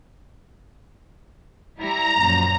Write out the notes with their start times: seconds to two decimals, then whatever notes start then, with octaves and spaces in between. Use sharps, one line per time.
1.78 G3 E4 A#5
2.18 F#2 A#2 F3